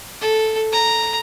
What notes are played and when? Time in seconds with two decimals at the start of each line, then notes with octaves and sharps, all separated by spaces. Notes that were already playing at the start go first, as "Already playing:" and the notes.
0.21 A4
0.72 A#5